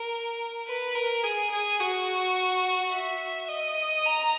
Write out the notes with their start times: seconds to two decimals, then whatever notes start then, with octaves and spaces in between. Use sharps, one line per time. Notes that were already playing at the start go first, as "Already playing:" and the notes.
Already playing: A#4
0.68 B4
0.95 A#4
1.24 G#4
1.52 G#4
1.80 F#4
2.92 E5
3.49 D#5
4.06 A#5